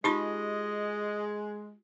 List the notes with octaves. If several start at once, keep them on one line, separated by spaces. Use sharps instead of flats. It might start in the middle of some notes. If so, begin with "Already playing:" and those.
G#3 D#4 F4 G4 D#5 A5 B5